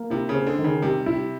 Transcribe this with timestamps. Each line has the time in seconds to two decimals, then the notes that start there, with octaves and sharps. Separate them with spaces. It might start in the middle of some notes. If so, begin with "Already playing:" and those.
Already playing: A#3
0.10 C3 E4
0.29 C#3
0.35 C4
0.47 D3
0.58 D#3
0.64 C#3
0.82 C3 G3
1.06 E4